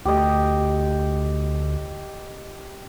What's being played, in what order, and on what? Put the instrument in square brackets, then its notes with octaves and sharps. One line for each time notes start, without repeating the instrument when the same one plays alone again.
[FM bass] D2 [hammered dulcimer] G4 D#5